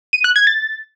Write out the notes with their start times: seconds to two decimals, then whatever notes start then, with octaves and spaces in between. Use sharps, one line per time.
0.13 D#7
0.24 F#6
0.36 G#6
0.47 A6